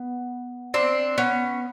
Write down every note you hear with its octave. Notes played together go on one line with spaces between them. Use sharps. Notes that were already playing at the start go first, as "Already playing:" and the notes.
Already playing: B3
C4 D4
B3 C#4